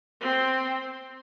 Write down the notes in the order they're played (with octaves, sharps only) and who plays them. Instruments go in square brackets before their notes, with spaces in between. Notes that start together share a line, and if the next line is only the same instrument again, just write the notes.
[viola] C4